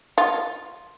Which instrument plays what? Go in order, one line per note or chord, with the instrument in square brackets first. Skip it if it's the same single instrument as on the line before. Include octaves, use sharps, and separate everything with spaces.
[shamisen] F4